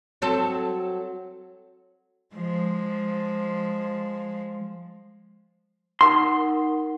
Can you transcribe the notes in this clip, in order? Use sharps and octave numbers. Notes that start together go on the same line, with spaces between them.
F#3 C4 A4
F3 G#3
D#4 A#4 F#5 C6